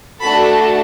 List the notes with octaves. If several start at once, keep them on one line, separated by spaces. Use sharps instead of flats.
A3 D4 F#4 A4 B5